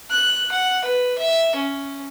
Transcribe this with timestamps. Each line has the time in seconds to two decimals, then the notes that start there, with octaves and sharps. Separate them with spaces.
0.11 F#6
0.52 F#5
0.84 B4
1.18 E5
1.55 C#4